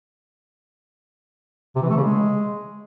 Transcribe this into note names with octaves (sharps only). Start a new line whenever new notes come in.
C3
E3
A3
C#3
G#3